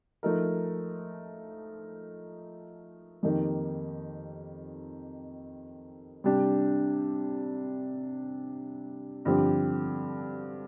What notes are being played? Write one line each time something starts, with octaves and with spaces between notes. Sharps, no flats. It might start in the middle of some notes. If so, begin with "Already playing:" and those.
F3 A3 D#4 A#4
F2 D#3 A#3 D#4 G4
C3 G3 D4 G4
G2 D3 F3 C4 G4